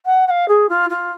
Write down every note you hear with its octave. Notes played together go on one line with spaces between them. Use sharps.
F#5
F#5
F5
G#4
F4
F4